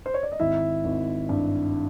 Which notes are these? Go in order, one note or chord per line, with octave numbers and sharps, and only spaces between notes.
C5
C#5
D5
D#5
G#1 E4 E5
G#1
G2